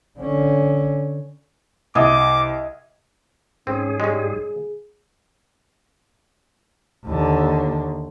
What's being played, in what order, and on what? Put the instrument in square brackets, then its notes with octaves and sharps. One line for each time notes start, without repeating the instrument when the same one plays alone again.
[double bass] D3 C#4
[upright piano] C2 [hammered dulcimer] D#5 [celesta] E5 G#6 [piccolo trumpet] D6
[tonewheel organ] G#2 G#4 [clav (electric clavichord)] C4 [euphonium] C#4
[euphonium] G3 [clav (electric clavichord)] G#3 C#4
[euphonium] G#4
[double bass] D#2 D3